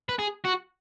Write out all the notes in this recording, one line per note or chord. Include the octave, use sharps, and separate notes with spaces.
B4
G#4
F#4